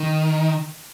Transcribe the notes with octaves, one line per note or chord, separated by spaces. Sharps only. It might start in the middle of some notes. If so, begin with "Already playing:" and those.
Already playing: D#3